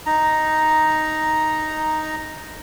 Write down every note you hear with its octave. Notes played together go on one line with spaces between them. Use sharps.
D#4 A#5